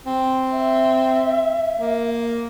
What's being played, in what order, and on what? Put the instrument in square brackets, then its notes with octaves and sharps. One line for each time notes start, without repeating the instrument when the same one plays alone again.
[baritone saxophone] C4
[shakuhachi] E5
[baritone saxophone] A#3